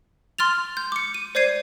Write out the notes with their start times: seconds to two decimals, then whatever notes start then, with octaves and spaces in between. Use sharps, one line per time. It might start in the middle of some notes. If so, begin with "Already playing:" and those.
0.38 C6 F6 A6 F7
0.77 G6
0.92 D6 C#7
1.14 D#7
1.35 C5 D5 G6 G#6 C7 D#7